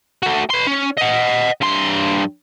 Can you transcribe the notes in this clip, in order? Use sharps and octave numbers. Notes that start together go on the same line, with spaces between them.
A3 F#4
B4 C6
C#4
D#5 F#5
G2 C6